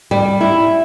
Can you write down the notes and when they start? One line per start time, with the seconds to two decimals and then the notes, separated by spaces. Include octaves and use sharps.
0.11 G3
0.41 E4